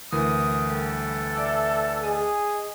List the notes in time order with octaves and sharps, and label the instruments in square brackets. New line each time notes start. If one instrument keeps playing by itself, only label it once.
[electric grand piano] D2 E3 [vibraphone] A#4 [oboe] D#6
[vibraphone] G3 [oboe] A4
[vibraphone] D5 E5 D6
[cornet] G#4 [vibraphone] D#5